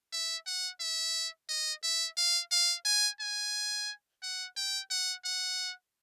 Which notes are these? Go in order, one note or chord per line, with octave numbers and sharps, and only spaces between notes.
E5
F#5
E5
D#5
E5
F5
F5
G#5
G#5
F#5
G5
F#5
F#5